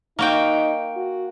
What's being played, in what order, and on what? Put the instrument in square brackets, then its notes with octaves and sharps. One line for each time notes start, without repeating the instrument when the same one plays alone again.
[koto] A#3 F#4 G5 [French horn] D#4
[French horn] F#4